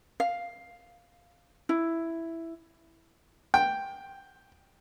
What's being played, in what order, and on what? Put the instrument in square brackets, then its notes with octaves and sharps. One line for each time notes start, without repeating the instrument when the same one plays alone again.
[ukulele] F5
E4
[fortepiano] G5